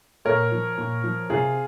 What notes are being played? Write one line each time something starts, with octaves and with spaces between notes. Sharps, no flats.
A#2 A#4 C#5
F3
A#2
F3
C3 F4 G#4